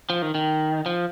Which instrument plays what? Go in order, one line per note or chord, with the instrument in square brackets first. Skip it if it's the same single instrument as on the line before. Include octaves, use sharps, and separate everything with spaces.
[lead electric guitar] F3
D#3
D#3
F3